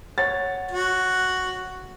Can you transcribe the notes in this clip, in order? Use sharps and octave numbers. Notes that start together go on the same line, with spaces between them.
C#5 F#5 A6
F#4